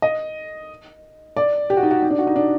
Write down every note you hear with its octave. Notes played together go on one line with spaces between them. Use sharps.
D#5
D5
G4
F#4
D#4
F#4
D#4
D4
F#4
D#4
D4